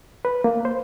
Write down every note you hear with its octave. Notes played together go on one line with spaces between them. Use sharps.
B4
A#3
C5